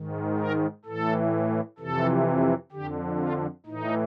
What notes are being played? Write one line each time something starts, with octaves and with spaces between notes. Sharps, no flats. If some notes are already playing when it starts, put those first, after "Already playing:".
Already playing: G#2 D#3
A#4
A2 E3 A4
F2 C3 E3 A4
F2 D3 G4
F4
A2 E3 D#4